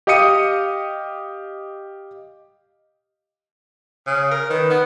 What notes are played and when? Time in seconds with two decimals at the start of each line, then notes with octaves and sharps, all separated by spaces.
0.07 G4 D#5 F5 D#6 C#7 D#7
4.07 C#3
4.31 A#4
4.50 D#3 B4
4.70 B3